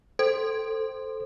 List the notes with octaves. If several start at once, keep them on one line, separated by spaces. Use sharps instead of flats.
A4 C5